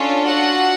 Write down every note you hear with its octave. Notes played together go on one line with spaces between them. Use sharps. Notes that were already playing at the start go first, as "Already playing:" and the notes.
Already playing: C#4 D4 F4 A4 C#5
F#4 F#5